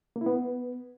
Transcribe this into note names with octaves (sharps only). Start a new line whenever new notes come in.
A#3
E4
B3